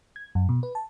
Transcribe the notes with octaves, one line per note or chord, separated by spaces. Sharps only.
G#6
F#2
B2
B4
A5